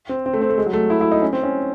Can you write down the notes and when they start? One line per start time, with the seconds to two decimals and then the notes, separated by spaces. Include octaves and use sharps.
0.09 C4
0.26 C4
0.34 A3
0.41 C4
0.50 A3
0.58 G#3
0.66 F#3
0.73 A3
0.90 E4
1.01 E4
1.12 D#4
1.22 C#4
1.33 C4
1.43 C#4